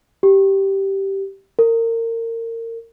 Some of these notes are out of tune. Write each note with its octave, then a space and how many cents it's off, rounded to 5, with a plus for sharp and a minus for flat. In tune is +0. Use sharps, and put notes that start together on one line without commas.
G4 -10
A#4 -30